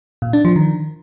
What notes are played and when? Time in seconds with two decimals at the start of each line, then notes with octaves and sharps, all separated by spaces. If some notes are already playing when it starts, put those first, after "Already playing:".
0.22 A#2
0.33 D4
0.45 F3
0.56 D#3